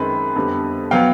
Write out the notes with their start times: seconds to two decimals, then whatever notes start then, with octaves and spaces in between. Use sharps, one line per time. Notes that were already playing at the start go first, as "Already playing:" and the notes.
Already playing: F#2 D#3 G#3 C4 B4
0.36 F2 D3 G3 B3
0.91 B2 F#3 B3 F5 G5